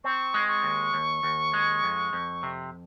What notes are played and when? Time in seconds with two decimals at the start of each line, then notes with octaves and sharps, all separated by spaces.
0.04 C4 C#6
0.34 G#3
0.48 C#6
0.63 D#2
0.94 D#2
1.23 D#2
1.54 G#3
1.84 F2
2.13 F2
2.43 C3